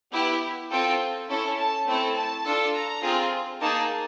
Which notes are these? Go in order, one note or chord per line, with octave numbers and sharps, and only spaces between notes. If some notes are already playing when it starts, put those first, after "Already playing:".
B3 E4 G4
C4 F4 A4 G5
C#4 E4 A4
A5
A3 C4 E4 A4
A5
D4 F4 A4
A#5
C4 F4 G#4
A#3 D#4 G#4 A5